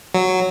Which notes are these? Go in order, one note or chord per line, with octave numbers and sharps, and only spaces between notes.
F#3